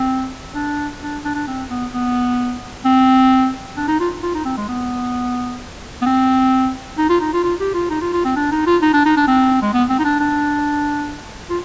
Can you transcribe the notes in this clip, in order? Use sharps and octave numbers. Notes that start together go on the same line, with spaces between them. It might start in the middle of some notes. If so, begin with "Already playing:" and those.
Already playing: C4
D4
D4
D4
D4
C4
B3
B3
C4
D4
D#4
F4
F4
D#4
C4
G#3
B3
B3
C4
D#4
F4
D#4
F4
F4
G4
F4
D#4
F4
F4
C4
D4
D#4
F4
D#4
D4
D#4
D4
C4
G#3
B3
C4
D#4
D4
D4
F4